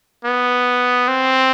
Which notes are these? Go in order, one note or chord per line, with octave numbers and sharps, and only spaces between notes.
B3
C4